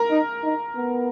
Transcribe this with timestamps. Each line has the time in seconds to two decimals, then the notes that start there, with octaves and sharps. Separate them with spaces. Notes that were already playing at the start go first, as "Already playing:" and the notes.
Already playing: A#4 A#5
0.11 D#4
0.44 D#4
0.76 B3